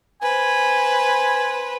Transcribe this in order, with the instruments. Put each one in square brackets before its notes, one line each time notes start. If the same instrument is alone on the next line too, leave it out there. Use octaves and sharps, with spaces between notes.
[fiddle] B4 C5 [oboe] G#5